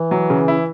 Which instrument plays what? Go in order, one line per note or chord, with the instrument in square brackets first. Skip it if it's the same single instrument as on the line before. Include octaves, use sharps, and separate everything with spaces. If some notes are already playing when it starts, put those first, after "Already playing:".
Already playing: [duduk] E3
[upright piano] F#3
C#3
E4